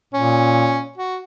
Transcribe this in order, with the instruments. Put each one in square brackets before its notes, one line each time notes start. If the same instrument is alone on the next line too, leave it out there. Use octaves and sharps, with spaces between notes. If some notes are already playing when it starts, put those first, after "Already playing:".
[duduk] A#2 [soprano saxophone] C#4
[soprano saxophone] F#4